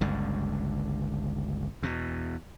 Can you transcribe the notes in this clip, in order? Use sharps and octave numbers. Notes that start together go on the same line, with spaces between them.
G1 C#2 G2 D3
E2 B2